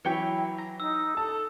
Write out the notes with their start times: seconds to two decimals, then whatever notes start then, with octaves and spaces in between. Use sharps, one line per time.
0.05 E3 F#3 E4 C#5 G5 B5
0.58 A#5
0.80 D#4 E6
1.17 A4 A5